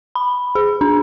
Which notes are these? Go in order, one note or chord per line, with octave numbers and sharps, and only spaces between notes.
B5
G#4
D4